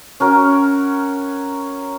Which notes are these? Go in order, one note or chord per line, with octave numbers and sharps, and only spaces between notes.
C#4 F#4 A#4